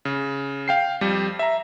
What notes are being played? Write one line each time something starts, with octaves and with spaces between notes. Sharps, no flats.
C#3
F5 G5 C7
F2 G3
E5 A#5